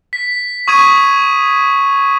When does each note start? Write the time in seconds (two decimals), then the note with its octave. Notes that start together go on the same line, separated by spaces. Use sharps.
0.13 B6
0.68 C#6 D#6 G#6 D#7